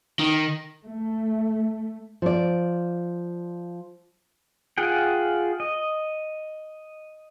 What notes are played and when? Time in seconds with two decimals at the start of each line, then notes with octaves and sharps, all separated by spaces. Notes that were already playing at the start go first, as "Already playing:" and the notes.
0.19 D#3
0.84 A3
2.22 F3 D5
4.78 F4 G#4 F#5 G5
5.60 D#5